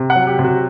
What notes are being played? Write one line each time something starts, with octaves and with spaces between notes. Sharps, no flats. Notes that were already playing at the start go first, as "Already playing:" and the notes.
Already playing: C3
F#5
F#3
G4
C3
F#4